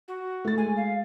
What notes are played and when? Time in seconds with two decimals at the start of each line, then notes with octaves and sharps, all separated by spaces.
0.08 F#4
0.45 A3 A6
0.57 G#3 G#5
0.76 F5